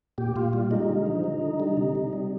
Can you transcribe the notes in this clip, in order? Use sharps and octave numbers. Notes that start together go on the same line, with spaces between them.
A#2 G4
A#2 F4
G3 F4
G#3 D#4
D3
F3
D3
D3
G3
C3
C3
G3